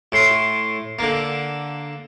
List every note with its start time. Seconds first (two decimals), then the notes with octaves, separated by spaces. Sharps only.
0.12 A2 C6
0.99 D3 A#3